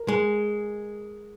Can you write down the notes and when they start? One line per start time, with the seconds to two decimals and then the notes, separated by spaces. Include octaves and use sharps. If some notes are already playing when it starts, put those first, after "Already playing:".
Already playing: A#4
0.08 G#3